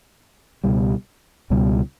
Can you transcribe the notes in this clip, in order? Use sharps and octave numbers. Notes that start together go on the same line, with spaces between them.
C#2 B2 G3
C#2 B2 G3